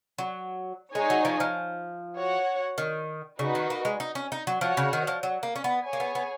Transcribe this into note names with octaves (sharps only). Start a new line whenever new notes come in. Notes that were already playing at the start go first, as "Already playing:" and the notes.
F#3
G#3 D#4 G#4 C#5 G#5
F#3
F3
F3
F#4 C#5 F#5
D#3
C#3 D#4 F#4 B4
D#3
A#3
G#3
D#4
C#4
D#4
F#3
F3 F#4 C#5 F#5
C#3
D#3
F3
F#3
A#3
C#4
B3
G#4 C#5 G#5
A#3
B3
B3